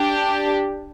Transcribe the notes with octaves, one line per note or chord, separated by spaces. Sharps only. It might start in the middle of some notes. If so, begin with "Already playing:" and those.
Already playing: D4 G4